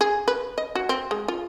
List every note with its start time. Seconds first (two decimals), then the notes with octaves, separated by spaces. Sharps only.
0.01 G#4
0.28 B4
0.58 D#5
0.75 F#4
0.89 C4
1.11 G#3
1.28 F4